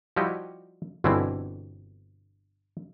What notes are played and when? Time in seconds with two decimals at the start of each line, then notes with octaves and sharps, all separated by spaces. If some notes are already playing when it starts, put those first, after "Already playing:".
0.16 F3 G3 E4 F#4 G4 D#5
1.04 G1 B2 D3 E3 C4 E4